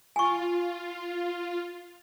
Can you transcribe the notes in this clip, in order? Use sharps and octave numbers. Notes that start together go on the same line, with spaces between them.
F4 G#5 C#6